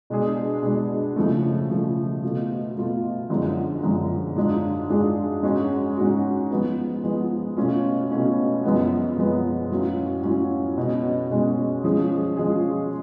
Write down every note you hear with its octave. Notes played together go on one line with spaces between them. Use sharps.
B2 G#3 D4 G#4
B2 G#3 D4 G#4
C#3 F3 A3
C#3 F3 A3
B2 A3 F4
B2 A3 F4
F#2 D3 F3 G#3
F#2 D3 F3 G#3
G#2 G#3 D4 F4 G#4
G#2 G#3 D4 F4 G#4
G#2 G#3 C#4 F#4
G#2 G#3 C#4 F#4
F3 G#3 B3
F3 G#3 B3
B2 A3 C#4 F4
B2 A3 C#4 F4
F#2 F3 G#3 B3
F#2 F3 G#3 B3
A2 F#3 C#4 F4
A2 F#3 C#4 F4
B2 G#3 C#4
B2 G#3 C#4
F3 G#3 C#4 F4 G#4
F3 G#3 C#4 F4 G#4